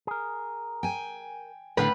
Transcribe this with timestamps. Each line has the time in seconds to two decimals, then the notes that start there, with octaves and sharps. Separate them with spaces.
0.07 G#4 A#4
0.83 G5 G#5
1.77 A2 D3 B3 C#4 B4 F5 G5